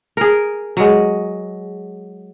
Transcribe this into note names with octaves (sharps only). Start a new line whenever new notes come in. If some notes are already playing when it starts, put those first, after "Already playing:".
G#4 A#4
F#3 G#3